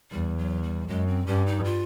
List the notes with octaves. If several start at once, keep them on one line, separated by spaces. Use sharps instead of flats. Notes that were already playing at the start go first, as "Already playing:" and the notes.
E2 G3
F#3
G3
F#2 G#3
C4
G2 C#4
D#4
F4